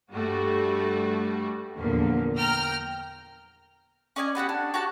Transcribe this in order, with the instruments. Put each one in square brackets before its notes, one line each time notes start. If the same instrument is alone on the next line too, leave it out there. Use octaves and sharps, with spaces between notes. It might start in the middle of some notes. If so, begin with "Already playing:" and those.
[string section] G2 G3 A3 F#4
E2 A#2 D3 F3 A#3
G5 A#5 F6
[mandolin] C#4 D5 D#5 G#5
B3 F#4 G4 F#5
D4
F#4 G4 F#5 A5